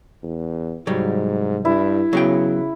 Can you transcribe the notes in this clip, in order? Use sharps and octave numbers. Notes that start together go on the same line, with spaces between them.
E2
C2 G#2 F#3 G3
G2 E4
C#3 F#3 B3 G5